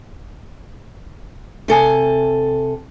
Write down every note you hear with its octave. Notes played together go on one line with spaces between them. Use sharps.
C3 A4 G#5